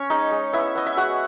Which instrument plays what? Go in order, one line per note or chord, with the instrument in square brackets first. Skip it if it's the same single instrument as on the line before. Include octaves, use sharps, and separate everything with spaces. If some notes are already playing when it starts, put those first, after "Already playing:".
Already playing: [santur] C#4 C#5
G#3 D#4 D#5
G#3
B3 E4 E5
B3 D#5
E5
G#3 F#4 F#5